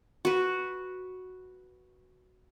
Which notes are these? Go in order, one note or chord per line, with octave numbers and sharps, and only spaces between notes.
F#4 B4